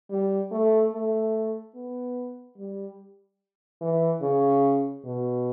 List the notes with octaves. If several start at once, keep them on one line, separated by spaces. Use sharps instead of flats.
G3
A3
A3
B3
G3
E3
C#3
B2